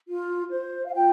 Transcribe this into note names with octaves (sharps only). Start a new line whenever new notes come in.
F4
C5
F5
F4 G5